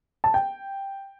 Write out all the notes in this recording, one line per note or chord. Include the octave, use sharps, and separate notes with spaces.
A5
G5